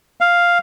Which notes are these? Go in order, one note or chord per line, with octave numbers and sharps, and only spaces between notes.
F5